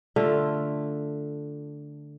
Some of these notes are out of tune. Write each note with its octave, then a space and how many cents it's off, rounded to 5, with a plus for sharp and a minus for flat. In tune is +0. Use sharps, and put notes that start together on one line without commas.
D3 +0 A3 +0 F4 +0